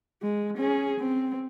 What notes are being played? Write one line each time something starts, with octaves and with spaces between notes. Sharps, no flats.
G#3
C#4 G#4
C4